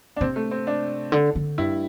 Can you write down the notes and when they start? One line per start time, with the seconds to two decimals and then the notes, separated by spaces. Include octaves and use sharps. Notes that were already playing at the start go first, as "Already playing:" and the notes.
0.16 D4
0.21 C3 C4
0.36 A3
0.51 C4
0.67 D4
1.12 D3
1.35 D3
1.58 G2 E4